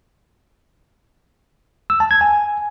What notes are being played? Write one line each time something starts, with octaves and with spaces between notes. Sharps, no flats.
E6
A5
G#6
G#5